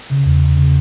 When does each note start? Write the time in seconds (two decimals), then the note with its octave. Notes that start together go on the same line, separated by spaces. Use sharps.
0.10 C#3
0.25 E2
0.41 E2
0.57 C#3